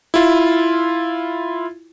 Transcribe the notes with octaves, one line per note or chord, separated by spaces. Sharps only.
E4 F4